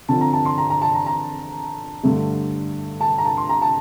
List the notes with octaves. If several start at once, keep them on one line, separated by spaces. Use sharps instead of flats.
D3 F3 C4 A5
A#5
A5
C6
A#5
A#5
A5
A#5
A#5
G2 D3 A3
A5
A#5
A5
C6
A#5
A5